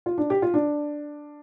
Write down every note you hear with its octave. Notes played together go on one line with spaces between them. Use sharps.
F4
D4
G4
F4
D4